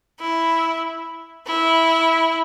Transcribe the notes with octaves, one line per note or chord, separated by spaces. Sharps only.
E4
E4